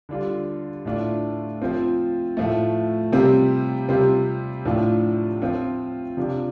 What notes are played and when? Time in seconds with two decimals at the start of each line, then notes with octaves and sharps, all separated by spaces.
0.09 D3 G3 D4 F4
0.85 A2 A3 D4 F4
1.61 F3 C4 F4
2.37 A2 F3 A3
3.12 C3 G3 C4 F4
3.89 C3 G3 C4 F4
4.65 A2 F3 D4 F4
5.42 F3 C4 F4
6.17 C3 F3 D4 F4